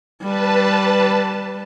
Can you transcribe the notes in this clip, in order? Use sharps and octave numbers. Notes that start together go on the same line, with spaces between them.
G3 B4 A5